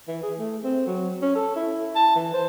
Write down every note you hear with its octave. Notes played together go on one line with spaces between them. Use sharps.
E3
G#4
A3
C4
F#3
C#4
A4
E4
A5
E3
C5